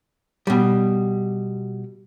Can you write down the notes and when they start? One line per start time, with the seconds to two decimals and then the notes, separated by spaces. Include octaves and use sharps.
0.47 B2 G3